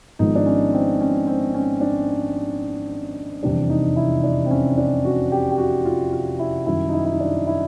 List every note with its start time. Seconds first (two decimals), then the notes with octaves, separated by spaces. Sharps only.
0.19 G#1 G#2 F3 G#3 B3 D#4
0.35 D4
0.46 C#4
0.73 C4
1.01 C#4
1.27 C4
1.54 C#4
1.81 D4
3.43 F1 E2 C3 E3 G3 D4
3.70 D#4
3.96 E4
4.24 D4
4.45 C4
4.51 C#4
4.78 D4
5.05 F#4
5.32 G4
5.51 G4
5.58 F#4
5.85 F4
6.12 F4
6.39 E4
6.66 F#2 D#3 G3 E4
6.89 D#4
6.94 E4
7.05 E4
7.12 D#4
7.20 D4
7.47 E4